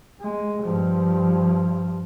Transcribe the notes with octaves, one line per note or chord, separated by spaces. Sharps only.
G#3
G2 F3